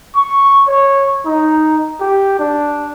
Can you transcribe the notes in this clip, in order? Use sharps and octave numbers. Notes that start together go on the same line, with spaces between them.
C#6
C#5
D#4
G4
D4